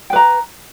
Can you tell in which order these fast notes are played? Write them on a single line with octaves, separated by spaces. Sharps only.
G5 B4 A#5